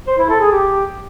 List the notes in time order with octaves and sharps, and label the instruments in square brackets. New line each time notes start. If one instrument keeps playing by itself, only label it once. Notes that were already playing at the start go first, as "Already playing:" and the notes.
[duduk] C5
E4
A4
G#4
G4